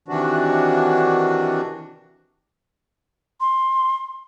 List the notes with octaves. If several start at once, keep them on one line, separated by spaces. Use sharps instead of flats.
C3 D#3 E3 D4 F#4
C6